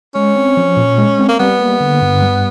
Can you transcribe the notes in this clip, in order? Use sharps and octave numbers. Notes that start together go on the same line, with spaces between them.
G#3 C#4
C4
F3
A#2
G#3
C4
A#3
G3 B3
A#3
D3
G2
G3